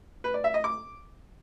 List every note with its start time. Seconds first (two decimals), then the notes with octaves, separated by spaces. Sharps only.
0.24 B4
0.34 D5
0.44 E5
0.54 D#5
0.64 D6